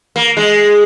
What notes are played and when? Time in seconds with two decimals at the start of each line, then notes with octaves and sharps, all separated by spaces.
0.16 A#3
0.37 G#3